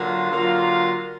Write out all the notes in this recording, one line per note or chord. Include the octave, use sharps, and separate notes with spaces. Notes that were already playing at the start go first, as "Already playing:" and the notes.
Already playing: D3 F#3 A#3 F4
D3 F#3 A#3 F4